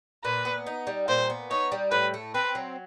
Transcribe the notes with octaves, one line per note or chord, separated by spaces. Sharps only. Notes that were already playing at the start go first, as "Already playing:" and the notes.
A#2 B4
B3
D#4
G3
A#2 C5
B3
D#4 C#5
G3
A2 B4
A3
C4 B4
F#3